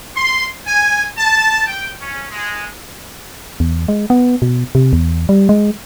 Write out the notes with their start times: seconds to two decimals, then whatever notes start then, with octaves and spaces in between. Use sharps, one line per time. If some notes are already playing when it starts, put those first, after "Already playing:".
0.15 C6
0.66 G#5
1.18 A5
1.66 G5
2.00 C#4
2.31 G#3
3.60 E2
3.88 G#3
4.10 B3
4.42 B2
4.75 C3
4.93 E2
5.29 G3
5.49 G#3